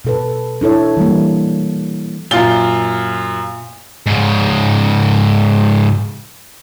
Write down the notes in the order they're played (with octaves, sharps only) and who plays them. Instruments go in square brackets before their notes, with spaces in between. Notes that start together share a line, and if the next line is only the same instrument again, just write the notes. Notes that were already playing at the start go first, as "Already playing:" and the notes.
[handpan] B2 A4 B4
D4 E4 A4 C#5
E3 G3 A#3
[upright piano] F#2 F4 G7 [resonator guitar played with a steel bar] A#2
[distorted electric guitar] G#2 C#3